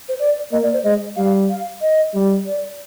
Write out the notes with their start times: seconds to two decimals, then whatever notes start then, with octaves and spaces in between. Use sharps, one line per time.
0.09 C5
0.19 D5
0.52 A#3 D#5
0.63 D5
0.73 C5
0.84 G#3 D#5
1.16 G3 F5
1.50 F5
1.82 D#5
2.14 G3
2.46 D5